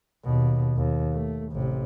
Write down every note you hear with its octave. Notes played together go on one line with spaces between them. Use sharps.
D#2 B2
D#2
A3
A1 C3